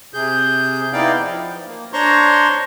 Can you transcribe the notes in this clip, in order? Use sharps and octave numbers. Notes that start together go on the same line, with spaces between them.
C3 G#4 G6
B3 D#4 E4 D5 F5 G5
F3
A#3
D4 C5 C#5 A#5 C6 C#6